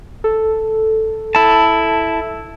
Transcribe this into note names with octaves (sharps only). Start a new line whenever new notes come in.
A4
E4 A5